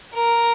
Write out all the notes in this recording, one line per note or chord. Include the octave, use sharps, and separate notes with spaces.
A#4